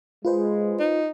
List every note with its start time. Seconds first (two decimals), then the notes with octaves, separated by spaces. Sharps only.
0.25 G#3 F4 B4 C5
0.79 D#4